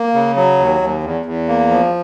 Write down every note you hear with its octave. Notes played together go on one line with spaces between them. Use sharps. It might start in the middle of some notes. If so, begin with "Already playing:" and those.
Already playing: A#3
C#3
F#3
D#2
D#2
E2
E2
A#3
F3